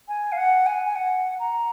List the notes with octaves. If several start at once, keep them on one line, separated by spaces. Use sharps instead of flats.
G#5
F5
F#5
G#5
G#5
F#5
A#5